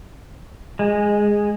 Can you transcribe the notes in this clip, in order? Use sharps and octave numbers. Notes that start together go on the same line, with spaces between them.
G#3